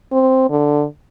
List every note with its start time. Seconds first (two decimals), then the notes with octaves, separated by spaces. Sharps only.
0.12 C4
0.50 D3